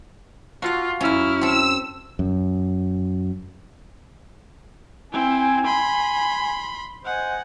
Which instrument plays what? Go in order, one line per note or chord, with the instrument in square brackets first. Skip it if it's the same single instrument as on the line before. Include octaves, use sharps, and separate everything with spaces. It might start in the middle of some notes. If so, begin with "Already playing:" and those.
[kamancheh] F4 [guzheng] F#4 A4 F5
[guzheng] F#2 C#4 [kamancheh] E4 F6
[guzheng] C4 A4 [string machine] E6
[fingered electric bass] F#2
[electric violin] C4 E4 [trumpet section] G#5
[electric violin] B5 C6
[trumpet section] C5 D#5 G#5 [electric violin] F#5